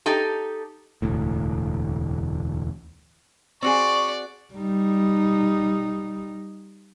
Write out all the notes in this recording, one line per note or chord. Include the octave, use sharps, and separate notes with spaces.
D#4 G4 A4
E1 D2 A2
C4 F#4 G#4 D5 C#6
G3 D#4